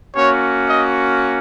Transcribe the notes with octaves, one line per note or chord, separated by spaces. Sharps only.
A#3 C#4 F#4 C#5
D#5